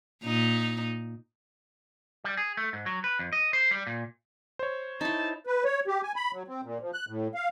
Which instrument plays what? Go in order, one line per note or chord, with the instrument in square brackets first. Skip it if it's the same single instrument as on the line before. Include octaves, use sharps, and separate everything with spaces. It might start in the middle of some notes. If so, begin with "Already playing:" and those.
[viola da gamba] A#2 D#4
[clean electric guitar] G3
G#4
A3
G#2
F#3
B4
F2
D#5
C5
G3
A#2
[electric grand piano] C5 C#5
[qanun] D#4 E4 [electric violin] A5
[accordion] B4
C#5
G4
G#5
B5
F#3
C4
A#2
F3
F#6
A2
F5